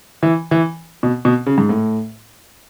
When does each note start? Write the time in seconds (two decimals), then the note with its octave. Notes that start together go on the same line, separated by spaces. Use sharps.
0.23 E3
0.51 E3
1.03 B2
1.25 B2
1.46 C#3
1.58 G#2
1.69 A2